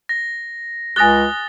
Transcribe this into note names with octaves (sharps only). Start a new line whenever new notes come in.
A#6
C#2 G4 G#5 D#6 F#6 A6 A#6 G7